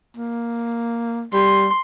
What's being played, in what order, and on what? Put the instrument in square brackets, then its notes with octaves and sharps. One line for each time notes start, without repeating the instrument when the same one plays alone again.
[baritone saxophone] A#3
[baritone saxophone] G3 [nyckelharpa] C6